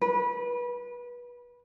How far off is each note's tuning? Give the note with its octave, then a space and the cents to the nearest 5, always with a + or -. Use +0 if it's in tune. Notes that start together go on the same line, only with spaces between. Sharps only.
B4 -25